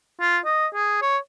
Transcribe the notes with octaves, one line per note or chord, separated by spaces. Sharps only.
F4
D#5
G#4
C#5